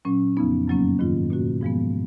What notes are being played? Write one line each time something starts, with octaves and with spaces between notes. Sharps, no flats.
A#2 F#3 C#4
F2 C#3 F3 B3 D#4
F#2 C#3 F#3 A#3 C#4
G#2 D#3 A#3 F4
B2 A#3 C#4 F#4
G#2 F3 G#3 B3